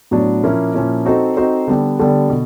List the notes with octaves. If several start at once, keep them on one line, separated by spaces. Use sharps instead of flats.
A2 F#3 B3 D4
A#2 F3 A#3 C#4 E4
A#2 F3 A#3 C#4 E4
C4 D#4 F#4 A4 C5
C4 D#4 F#4 A4 C5
D3 G3 B3 D4
D3 G3 B3 D4
B2